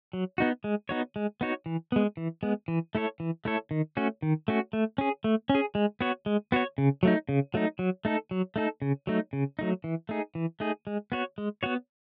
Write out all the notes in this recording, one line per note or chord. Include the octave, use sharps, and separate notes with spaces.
F#3
B3 D#4 F#4
G#3
B3 D#4 F#4 C#5
G#3
B3 D#4 F#4 C#5
E3
G#3 B3
E3
G#3 B3
E3
A3 E4 A4 C#5
E3
A3 E4 A4 C#5
D#3
A3 C#4 F#4
D#3
A3 C#4 F#4
A3
C#4 G#4
A3
C#4
G#4
G#3
B3 F#4 C#5
G#3
B3 F#4 C#5
C#3
F#3 A3 D#4
C#3
F#3 A3 D#4
F#3
A3 D#4 A4
F#3
A3 D#4 A4
C#3
F#3 A3 D#4
C#3
F#3 A3 D#4
E3
A3 D#4 G#4
E3
A3 D#4 G#4
G#3
B3 F#4 C#5
G#3
B3 F#4 C#5